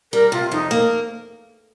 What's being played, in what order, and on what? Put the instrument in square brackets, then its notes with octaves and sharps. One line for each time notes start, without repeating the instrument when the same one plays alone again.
[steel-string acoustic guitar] G3 [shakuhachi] A#4
[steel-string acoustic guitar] C3 [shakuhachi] F4
[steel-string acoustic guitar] F2 [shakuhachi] D#4
[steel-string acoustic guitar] A#3